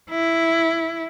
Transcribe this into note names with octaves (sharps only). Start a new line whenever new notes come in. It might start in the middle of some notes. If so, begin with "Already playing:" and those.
E4